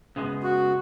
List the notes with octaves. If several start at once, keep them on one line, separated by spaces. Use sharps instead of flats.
F#2 C#3 G#3 B3 G#4
F#4